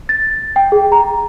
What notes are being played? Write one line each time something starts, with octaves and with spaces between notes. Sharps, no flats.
A6
G5
G#4
A#5